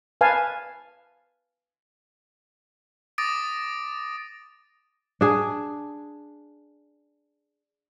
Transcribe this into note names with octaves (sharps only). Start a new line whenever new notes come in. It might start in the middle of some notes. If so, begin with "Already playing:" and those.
B4 F5 G#5 A5
D6 D#6 A6 A#6 D7 D#7
D4 G#4